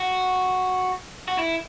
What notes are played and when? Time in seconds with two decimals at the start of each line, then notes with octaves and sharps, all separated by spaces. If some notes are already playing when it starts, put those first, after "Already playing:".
Already playing: F#4
1.28 F#4
1.38 E4